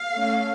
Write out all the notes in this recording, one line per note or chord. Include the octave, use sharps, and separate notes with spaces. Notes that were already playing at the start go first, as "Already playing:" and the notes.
Already playing: F5
A3 C#4